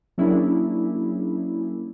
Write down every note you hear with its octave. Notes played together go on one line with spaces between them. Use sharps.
F#3 A#3 C#4 D4 E4 G#4